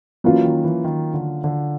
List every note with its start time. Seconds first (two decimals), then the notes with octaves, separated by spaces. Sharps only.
0.24 E3 F#3 A#3 C#4 F4
0.44 D#3
0.64 E3
0.84 D#3
1.14 D3
1.44 D3